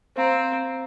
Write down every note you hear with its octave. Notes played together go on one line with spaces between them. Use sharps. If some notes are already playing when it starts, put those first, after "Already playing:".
C4 C5 F5 A#5